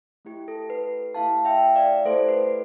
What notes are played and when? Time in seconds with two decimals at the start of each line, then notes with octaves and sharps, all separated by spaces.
0.25 A3 E4 G4
0.48 A4
0.70 B4
1.14 A3 E4 G4 F5 A5
1.45 E5 G5
1.75 D5 F5
2.05 A3 E4 G4 A4 C5
2.29 B4